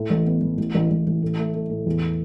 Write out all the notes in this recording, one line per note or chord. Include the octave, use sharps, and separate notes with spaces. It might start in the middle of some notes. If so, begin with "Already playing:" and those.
Already playing: A2
A1
B3
A1
A1
A1
A1
A1
A2
A3
A3
A2
E2